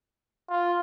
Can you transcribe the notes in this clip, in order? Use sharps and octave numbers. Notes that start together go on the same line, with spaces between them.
F4